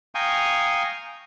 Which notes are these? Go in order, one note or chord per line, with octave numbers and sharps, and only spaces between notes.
F5 G5 G#5 A#5 C#6 D#6